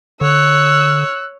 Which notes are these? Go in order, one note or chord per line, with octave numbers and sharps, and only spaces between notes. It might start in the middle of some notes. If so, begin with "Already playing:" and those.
D3 C#5 E6 F#6